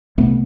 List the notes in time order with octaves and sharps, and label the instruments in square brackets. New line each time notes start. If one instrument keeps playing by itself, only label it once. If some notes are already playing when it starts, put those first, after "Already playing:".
[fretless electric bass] C2 C3 A3 B3